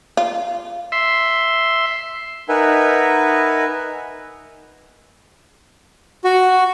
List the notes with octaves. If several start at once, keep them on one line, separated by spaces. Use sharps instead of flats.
F4
E5 C6
D#4 A#4 B4 E5 F#5 G#5
F#4